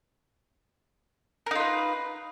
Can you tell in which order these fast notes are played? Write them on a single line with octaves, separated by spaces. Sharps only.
A#4 D#4 F4 B4